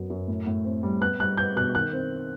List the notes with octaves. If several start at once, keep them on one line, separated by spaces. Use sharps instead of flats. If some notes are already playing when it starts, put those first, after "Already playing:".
Already playing: F#2 F#3 B3
F#2
A2
A2
C4
G3
B3 F#6
G3 F#6
B3 G6
B2 F#6
D#3 F#6
C4